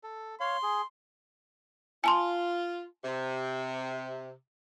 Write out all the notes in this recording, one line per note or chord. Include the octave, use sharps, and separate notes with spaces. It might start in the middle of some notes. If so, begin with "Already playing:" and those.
A4
C#5 F5 C6
G#4
F4 G#5 A5 C6
C3